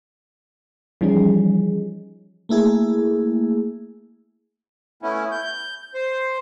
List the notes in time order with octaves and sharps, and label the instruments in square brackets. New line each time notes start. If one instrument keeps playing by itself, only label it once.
[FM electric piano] E3 F3 G3 C#4 D#4 G#4
A3 A#3 E4 G#4
[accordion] A3 B3 C#4 E4
G6
C5